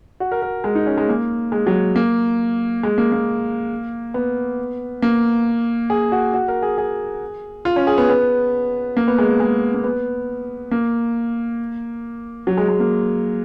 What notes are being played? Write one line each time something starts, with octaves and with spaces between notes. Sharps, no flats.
F#4
A#4
A#4
G#3
D#4
C#4
G#3
A#3
G#3
F#3
A#3
G#3
A#3
A#3
B3
A#3
G#4
F#4
F#4
A#4
G#4
G#4
F4
C#4
G#4
B3
B3
A#3
B3
G#3
G#3
A#3
B3
A#3
F#3
G#3
G#3
A#3